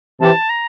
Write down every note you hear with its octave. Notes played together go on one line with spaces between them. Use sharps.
C3 E3 A5
A#5